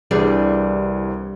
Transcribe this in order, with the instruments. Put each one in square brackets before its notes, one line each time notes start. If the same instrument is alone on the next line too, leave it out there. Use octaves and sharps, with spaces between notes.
[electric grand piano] C2 C3 E3 [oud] G3 D4 G#4